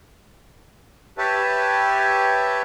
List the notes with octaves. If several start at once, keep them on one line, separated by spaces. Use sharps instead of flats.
G4 B4 C#5 E5 A5